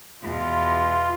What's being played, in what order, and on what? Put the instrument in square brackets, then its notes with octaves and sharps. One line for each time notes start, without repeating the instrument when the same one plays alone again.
[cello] E2 B2 [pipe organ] F4